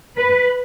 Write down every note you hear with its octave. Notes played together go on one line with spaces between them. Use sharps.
B4